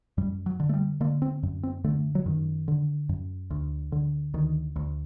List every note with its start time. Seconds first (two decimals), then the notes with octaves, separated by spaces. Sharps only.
0.18 F#2 G3
0.46 F#3
0.60 D3
0.69 A3
0.74 G3
1.01 D3 A#3
1.22 C4
1.43 F#2
1.63 C4
1.84 D3 A3
2.15 F#3
2.26 F#2 D#3
2.68 D3
3.09 F#2
3.50 D2
3.92 D3
4.34 D2 D#3
4.76 D2